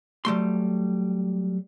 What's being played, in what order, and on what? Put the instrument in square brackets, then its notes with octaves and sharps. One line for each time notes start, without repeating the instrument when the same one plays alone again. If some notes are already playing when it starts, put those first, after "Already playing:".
[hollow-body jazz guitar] F#3 G3 A3 C6